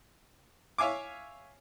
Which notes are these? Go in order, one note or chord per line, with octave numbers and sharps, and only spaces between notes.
C#5 E5 F5 G#5 D6